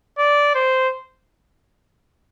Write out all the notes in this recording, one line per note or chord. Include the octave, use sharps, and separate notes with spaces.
D5
C5